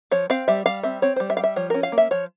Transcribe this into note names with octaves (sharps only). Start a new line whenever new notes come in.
F3 C#5
C4 F5
G3 E5
G3 F5
C4 E5
C4 C#5
G3 C5
E5
G3 F5
E5
F3 C#5
C#4 A#4
F5
A#3
E5
F3 C#5